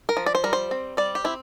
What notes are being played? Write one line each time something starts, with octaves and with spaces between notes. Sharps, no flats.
A#4
F3
D5
C5
G3 A#4
C5
C4
G3 D5
G4
C4 E4